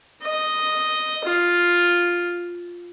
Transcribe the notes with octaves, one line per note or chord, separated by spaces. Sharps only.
D#5
F4